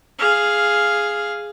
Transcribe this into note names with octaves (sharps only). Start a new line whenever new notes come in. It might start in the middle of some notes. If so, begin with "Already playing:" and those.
G#4 F5